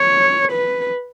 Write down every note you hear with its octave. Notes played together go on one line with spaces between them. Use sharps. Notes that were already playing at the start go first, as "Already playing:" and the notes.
Already playing: C#5
B4